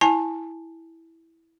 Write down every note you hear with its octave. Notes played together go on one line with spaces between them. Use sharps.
E4 G#5 A5